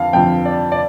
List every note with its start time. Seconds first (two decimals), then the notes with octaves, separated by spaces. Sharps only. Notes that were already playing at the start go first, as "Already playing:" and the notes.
Already playing: F2 D3 F3 F5
0.13 F2 D3 F3 G5
0.45 D5
0.72 D5